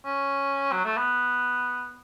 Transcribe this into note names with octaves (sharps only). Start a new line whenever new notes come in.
C#4
F#3
A3
B3